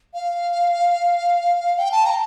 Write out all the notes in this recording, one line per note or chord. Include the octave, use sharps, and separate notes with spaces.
F5
G5
A5
A#5